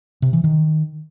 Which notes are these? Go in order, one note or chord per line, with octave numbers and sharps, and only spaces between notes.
C3
E3
D#3